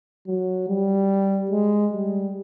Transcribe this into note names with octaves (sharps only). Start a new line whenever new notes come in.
F#3
G3
G#3
G3